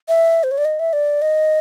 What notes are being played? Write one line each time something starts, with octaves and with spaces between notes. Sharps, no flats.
E5
C5
C#5
D5
D#5
E5
D5
D#5